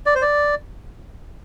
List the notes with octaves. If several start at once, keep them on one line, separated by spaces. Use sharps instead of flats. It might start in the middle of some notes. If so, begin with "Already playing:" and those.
D5
C5
D5